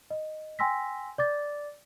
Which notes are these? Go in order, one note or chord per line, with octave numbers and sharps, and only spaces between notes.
D#5
G5 G#5 C6 E6 A#6 B6
D5 D6 A6